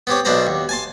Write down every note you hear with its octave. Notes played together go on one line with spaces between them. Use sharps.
B3 C4 G4 C#5
B1 B2 D4 B4 C5 A#5
D#2
G#5 A5 C6